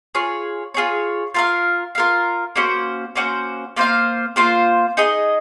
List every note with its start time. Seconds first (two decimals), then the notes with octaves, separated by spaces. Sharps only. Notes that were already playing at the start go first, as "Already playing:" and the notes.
0.15 F4 G#4 C#5
0.74 F4 G#4 C#5
1.35 F4 A#4 F5
1.95 F4 A#4 F5
2.56 A#3 C#4 F#4 C5
3.16 A#3 C#4 F#4 C5
3.76 A#3 F4 C5 F5
4.36 A#3 F4 C5 F5
4.97 D#4 G#4 D#5